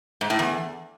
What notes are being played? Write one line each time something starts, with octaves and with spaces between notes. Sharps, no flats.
G#2
A2
E2